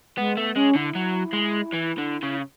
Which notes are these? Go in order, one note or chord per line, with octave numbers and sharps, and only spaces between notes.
G#3 B3
A3 B3
G#3 C#4
D3 E4
F#3
G#3
E3
D3
C#3